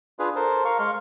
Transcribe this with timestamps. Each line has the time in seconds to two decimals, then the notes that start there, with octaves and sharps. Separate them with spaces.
0.19 D4 F4 G#4 B4
0.36 A4 A#4 C5
0.65 A#4 F5 C#6
0.79 G#3 F5 C6 C#6 F6